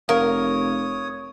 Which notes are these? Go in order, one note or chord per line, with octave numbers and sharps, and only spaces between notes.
F1 A#4 C#5 F5 D#6